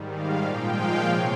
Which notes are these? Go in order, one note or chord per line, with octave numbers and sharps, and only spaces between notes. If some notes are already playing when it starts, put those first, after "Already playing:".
Already playing: G#2 D#3 G3
F5
A#2 F3 G#3 G5
F5
C3 C#5